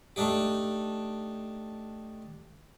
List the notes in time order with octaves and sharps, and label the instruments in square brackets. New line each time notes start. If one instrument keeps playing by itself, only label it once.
[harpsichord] A3 D4 D#4 G4